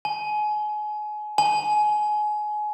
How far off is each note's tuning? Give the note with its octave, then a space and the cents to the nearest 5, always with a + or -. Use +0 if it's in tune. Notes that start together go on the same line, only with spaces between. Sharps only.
G#5 +30
G#5 +25